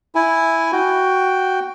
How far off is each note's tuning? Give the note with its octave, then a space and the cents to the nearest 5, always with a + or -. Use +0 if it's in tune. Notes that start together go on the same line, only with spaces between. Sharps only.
E4 +0 G#5 +0
F#4 +10 G5 +0